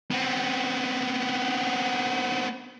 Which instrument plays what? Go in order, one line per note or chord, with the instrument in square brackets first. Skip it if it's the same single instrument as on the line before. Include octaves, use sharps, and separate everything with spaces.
[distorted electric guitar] B3 C4